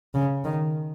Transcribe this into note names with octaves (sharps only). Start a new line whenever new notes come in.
C#3
D#3